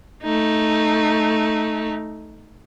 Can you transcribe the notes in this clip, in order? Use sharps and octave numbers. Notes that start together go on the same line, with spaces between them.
A3 D#4